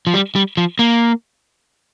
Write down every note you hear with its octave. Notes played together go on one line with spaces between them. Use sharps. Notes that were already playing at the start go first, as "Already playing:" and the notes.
F3
G3
G3
F3
A#3